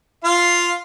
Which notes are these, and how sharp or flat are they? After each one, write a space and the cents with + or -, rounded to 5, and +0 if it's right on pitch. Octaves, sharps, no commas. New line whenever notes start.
F4 +0 F5 +0